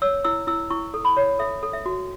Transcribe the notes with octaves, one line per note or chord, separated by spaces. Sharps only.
C#5 E6
E4 E6
E4 E6
E4 C#6
A4
B5
C#5
A4 E5
A4
E5
F#4